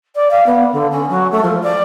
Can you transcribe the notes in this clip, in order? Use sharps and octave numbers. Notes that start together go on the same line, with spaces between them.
D5
F5
B3
D3
C#4
F#3
A3
F3
D5